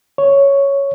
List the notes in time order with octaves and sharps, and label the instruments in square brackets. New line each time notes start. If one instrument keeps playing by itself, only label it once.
[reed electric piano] C#5